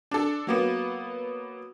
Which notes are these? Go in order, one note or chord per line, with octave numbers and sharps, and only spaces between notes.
D4 A4
F#3 A#3 B3